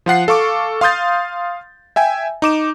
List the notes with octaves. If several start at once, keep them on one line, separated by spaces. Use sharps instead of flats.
F3 F4 F#5 C7
A4 F5 C#6 D6
F5 C6 D#6 G6 A6
E5 G5 G#5
D#4 D6 E7